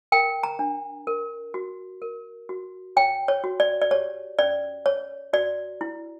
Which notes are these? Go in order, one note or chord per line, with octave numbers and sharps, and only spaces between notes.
A#4 G5
A#5
D4
A#4
F#4
A#4
F#4
C#5 G5
C#5
F#4
D5
D5
G4 C#5
C#4 D5
C#5
F#4 D5
E4